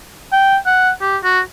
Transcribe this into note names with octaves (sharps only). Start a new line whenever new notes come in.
G5
F#5
G4
F#4